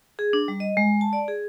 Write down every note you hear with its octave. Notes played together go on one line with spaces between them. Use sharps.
G#4
D4
G3
D#5
G#3
A5
D5
G#4